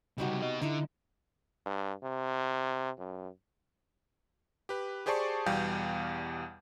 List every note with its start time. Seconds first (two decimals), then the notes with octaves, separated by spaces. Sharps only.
0.18 C#2 C3 G3 D#4 F#4
0.42 B2 D#5
0.62 D3 D#4 E4
1.66 G2
2.03 C3
2.98 F#2
4.69 G4 B4
5.06 G4 G#4 C5 D5 A5 C#6
5.46 E2 B2 G3 F5 G5 G6